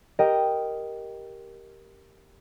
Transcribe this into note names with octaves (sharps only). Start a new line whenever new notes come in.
G4 A#4 D#5 G5